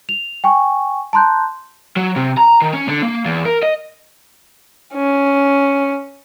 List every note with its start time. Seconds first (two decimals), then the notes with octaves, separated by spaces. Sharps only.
0.09 F7
0.44 G5 G#5 C#6
1.13 A5 A#5 C6 F#6 G6
1.97 F#3
2.16 C3
2.37 A#5
2.62 D#3
2.74 C#4
2.89 D3
3.03 A#3
3.25 E2
3.45 A#4
3.63 D#5
4.94 C#4